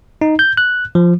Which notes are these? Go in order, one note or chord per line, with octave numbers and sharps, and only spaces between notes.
D#4
G6
F#6
F3